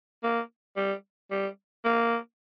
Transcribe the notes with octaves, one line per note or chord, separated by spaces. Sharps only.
A#3
G3
G3
A#3